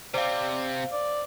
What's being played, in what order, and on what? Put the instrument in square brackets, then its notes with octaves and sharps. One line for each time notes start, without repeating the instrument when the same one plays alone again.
[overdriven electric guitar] C3 C4 [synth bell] C5 F5 [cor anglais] D5
[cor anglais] D5